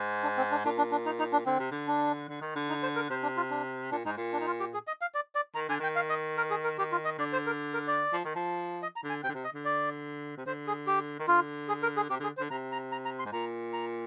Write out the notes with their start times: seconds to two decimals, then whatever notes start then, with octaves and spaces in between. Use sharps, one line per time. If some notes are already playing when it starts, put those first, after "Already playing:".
Already playing: G#2
0.23 D4
0.37 C4
0.51 D4
0.65 A#2 D4
0.78 D4
0.92 D4
1.06 D#4
1.19 D#4
1.33 D4
1.46 D3 C4
1.59 C3
1.71 D3
1.88 D4
2.29 D3
2.41 D#3
2.55 D3
2.69 D#4
2.83 C5
2.96 A#4
3.09 C3 C5
3.23 D4
3.37 F4
3.50 D4
3.91 A#2 D4
4.05 G#2 D#4
4.17 A#2
4.33 D4
4.40 D#4
4.47 F4
4.60 G4
4.74 G#4
4.87 D#5
5.01 F5
5.14 D5
5.35 D5
5.55 D#3 A#5
5.68 D3 G#5
5.80 D#3 G5
5.96 F5
6.10 D#5
6.37 A#4
6.51 G#4
6.64 A#4
6.78 D#3 G4
6.92 F4
7.05 D#5
7.18 D3 D5
7.33 C5
7.46 A#4
7.74 A#4
7.87 D5
8.13 F3
8.25 D#3
8.35 F3
8.83 D#5
8.96 A#5
9.04 D3
9.09 G#5
9.23 C3 G5
9.29 D3
9.34 C3
9.44 D#5
9.54 D3
9.65 D5
10.38 C3
10.46 D3 C5
10.67 G#4
10.87 G4
11.19 D#3
11.28 D3 F4
11.68 G#4
11.83 A#4
11.96 G#4
12.10 C3 G4
12.20 D3 G#4
12.37 C5
12.40 D3
12.50 C3 A#5
12.72 A#5
12.92 A#5
13.05 A#5
13.19 C6
13.25 G#2
13.32 A#2 A#5
13.73 A#5